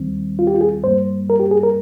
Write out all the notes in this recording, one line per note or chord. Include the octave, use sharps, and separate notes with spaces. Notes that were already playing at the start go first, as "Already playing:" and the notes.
Already playing: D#2 D#3 G3 C4
F4
G4
F4
G#4
G2 G3 A#3 C5
A#4
G4
G#4
A#4